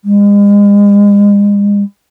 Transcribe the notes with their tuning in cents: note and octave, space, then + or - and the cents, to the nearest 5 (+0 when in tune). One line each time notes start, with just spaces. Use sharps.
G#3 -40